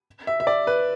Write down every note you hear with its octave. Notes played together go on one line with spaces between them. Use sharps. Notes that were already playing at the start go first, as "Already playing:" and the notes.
E5
E5
D5
B4